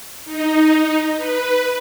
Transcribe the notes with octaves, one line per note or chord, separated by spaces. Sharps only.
D#4
B4